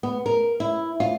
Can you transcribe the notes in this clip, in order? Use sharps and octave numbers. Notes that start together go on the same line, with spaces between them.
B3
A#4
E4
F4